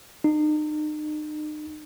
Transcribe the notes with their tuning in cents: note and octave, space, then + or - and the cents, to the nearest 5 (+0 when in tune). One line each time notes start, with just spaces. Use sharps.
D#4 -40